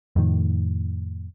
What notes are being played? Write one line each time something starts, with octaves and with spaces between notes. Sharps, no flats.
F2 A2 D#3